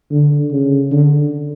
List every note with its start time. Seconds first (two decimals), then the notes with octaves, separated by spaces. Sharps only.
0.11 D3
0.52 C#3
0.91 D3